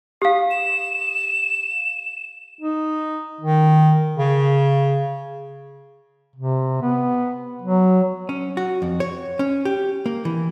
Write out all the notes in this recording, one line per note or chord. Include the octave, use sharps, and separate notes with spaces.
G4 F5 D#6
E7
D#4
D#3
C#3
C3
B3
F#3
C#4
F#4
F2
C#5
C#4
G4
A#3
E3